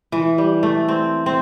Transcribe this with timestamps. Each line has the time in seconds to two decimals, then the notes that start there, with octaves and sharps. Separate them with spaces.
0.12 E3
0.38 G3
0.63 A3
0.88 C4
1.26 C4